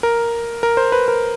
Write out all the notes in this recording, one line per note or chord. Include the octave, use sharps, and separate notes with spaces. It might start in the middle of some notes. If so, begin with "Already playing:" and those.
A#4
A#4
C5
B4
A#4